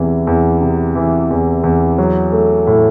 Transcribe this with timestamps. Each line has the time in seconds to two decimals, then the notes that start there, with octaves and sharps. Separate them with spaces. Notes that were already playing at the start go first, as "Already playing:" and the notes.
Already playing: E2 C3 E3
0.27 E2
0.61 C3
0.95 E3
1.31 E2
1.64 E2
1.98 F#3
2.32 A3
2.67 A2